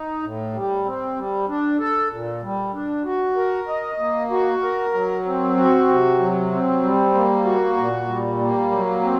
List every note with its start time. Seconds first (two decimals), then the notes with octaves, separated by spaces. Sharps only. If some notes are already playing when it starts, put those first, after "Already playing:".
Already playing: D#4
0.23 A2
0.54 G3
0.85 C4
1.16 G3
1.48 D4
1.79 A4
2.11 A#2
2.42 G3
2.74 D4
3.05 F#4
3.36 A#4
3.68 D#5
3.99 A#3
4.31 F#4
4.62 A#4
4.94 F#3
5.25 C4
5.57 F#4
5.88 C3
6.19 F#3
6.51 C4
6.83 G3
7.14 A#3
7.45 F#4
7.77 A#2
8.08 G3
8.40 A#3
8.71 F#3
9.03 C4